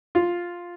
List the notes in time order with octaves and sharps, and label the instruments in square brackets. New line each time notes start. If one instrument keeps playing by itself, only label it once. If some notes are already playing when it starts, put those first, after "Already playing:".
[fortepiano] F4